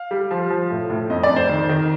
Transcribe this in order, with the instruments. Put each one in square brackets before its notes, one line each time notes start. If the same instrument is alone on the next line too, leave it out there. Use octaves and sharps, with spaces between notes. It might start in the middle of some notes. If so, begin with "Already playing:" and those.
Already playing: [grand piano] F5
G3
F3
F3
A2
A2
F2 D#5
D5
F2
C5
D#3
D#3